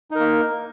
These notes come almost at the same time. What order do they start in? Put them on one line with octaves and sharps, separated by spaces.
D#4 A#4 A#3